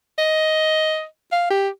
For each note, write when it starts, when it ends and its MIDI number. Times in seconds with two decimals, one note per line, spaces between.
0.18 1.04 75
1.32 1.48 77
1.50 1.69 67